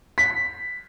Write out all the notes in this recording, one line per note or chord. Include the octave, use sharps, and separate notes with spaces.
B6